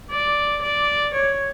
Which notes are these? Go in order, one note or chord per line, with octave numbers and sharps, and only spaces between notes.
D5
D5
C#5